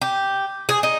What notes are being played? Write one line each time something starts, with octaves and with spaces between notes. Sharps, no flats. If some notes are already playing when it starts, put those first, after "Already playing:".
G4
G#4
D#4